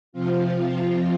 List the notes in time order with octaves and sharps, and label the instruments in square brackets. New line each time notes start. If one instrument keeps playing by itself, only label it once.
[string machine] C3 F3 C4 F4